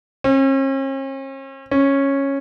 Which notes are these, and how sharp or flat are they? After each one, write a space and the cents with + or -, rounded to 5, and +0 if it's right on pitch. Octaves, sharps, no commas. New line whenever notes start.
C#4 -45
C#4 -10